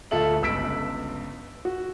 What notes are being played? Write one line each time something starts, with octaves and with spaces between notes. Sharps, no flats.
D2 F4 A4 E5 F#7
G1 C#2 E6 B6 D7
F#4